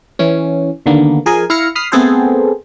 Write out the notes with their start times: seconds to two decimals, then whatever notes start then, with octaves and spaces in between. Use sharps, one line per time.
0.19 E3 C#4
0.86 D#2 D3 A#3 B3
1.26 F3 G#4 A#4 D#5 G#5
1.50 E4 F5 F6 A#6 C#7
1.75 B5 D#6 F6 C7
1.92 A3 B3 C4 G#4 A4 C5